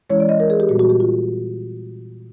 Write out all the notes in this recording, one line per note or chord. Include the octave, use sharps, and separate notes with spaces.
E3 G#3 C#4 E4 C#5
D5
D#5
A#4
G#4
G4
A#2 G3 B3 F#4
F#4
G4
F4